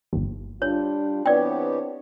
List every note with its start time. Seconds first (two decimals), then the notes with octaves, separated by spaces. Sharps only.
0.13 G1 D#2
0.62 G3 D4 F4 C#5
1.26 E3 B3 C4 D4 G4 C#5 D5 G5